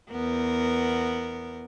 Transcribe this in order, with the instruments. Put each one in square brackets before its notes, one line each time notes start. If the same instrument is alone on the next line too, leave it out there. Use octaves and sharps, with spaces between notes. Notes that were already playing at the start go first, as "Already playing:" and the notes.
[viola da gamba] E2 B3 A#4